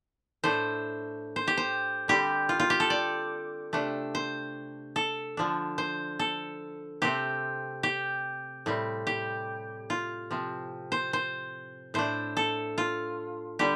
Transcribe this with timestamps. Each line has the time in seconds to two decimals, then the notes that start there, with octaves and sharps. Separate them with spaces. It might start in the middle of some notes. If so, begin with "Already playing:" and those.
0.44 A2 A3 D4 C5
1.36 C5
1.47 G4
1.57 C5
2.08 D3 G3 C4 G4
2.49 F4
2.60 F4
2.70 G4
2.80 A4
2.90 D5
3.73 C3 A3 D4
4.15 C5
4.96 A4
5.37 D3 F3 D4
5.78 C5
6.19 A4
7.02 C3 A3 C4 G4
7.83 G4
8.66 A2 G3 C4
9.07 G4
9.90 F4
10.31 C3 F3 C4
10.92 C5
11.13 C5
11.94 A2 A3 D4 C5
12.37 A4
12.78 F4
13.59 D3 G3 G4